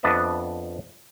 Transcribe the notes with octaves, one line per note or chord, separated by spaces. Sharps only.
F2 B3 D4 B4 D#5 E5